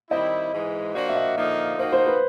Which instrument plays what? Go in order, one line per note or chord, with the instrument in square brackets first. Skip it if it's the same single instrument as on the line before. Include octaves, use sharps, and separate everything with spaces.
[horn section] D#3 G3 C4 E4 [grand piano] D#5
[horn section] G#2 E3 G#3
[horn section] F3 A#3 D4 F#4 [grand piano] D5
[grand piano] E5
D#5
[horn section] D3 F3 A#3 D#4
[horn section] F3 A#3 D#4 F#4 [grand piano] C5
[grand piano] C5
B4